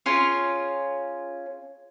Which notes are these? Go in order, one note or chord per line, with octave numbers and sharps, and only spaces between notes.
C#4 F4 G#4 C#5